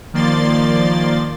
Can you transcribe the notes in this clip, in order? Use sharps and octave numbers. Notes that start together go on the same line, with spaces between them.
D#3 F3 A#3 D5 C6 A6